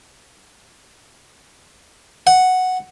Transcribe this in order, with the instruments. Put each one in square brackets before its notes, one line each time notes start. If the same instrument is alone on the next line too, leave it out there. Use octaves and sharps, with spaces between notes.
[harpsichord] F#5